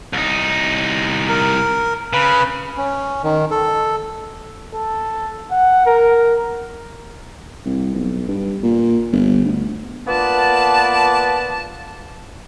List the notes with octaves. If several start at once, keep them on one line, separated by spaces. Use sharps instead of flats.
C2 D#4
A#4
C#3 B4
C#4
D#3
A4
A4
F#5
A#4
C2
B1
G2
A#2
G1
D2
A#3 B3 F4 B4 D5 A5